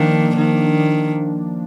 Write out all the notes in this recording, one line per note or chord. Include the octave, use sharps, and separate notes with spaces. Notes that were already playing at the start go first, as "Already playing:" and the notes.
Already playing: D#3 F3 A#3 D4
D#3